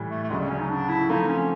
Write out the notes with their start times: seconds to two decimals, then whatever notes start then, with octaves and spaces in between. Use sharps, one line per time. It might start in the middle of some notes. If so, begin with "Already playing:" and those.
Already playing: A2 E3 G3
0.11 A3
0.24 A3
0.30 D2 C#3 F#3 G#3
0.40 G3
0.50 C#4
0.60 D#4
0.70 D4
0.89 E4
1.09 F3 A3 C4 D#4 F4
1.28 C#4